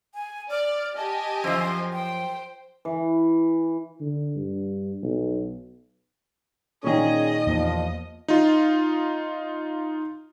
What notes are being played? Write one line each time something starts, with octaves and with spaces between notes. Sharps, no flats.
G#5
D5 F6
G4 D#5 G#5 A5
F#2 F3 C5
C5 G5
E3
D3
G2
B1
A#2 D#3 C#4 G#4 D#5
E2 F3 A#3
D#4 F4